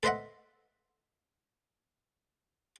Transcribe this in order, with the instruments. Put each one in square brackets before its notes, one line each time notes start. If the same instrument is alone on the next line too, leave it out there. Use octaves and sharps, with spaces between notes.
[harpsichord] A4 B4 C5 D#5 E5 F#5